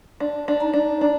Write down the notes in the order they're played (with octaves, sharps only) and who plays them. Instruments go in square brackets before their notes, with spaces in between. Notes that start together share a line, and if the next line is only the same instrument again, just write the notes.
[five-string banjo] D4
D4
[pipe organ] D#4
[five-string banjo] D4
D4